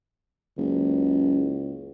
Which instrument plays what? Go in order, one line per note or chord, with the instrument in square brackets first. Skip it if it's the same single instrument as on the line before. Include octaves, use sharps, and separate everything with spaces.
[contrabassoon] F#1 [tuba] C#2